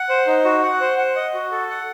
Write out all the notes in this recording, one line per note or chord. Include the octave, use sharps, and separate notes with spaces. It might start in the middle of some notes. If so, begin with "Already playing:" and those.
Already playing: F#5
C5
D#4
F#4
F#5
C5
F#5
D#5
F#4
A4
F#5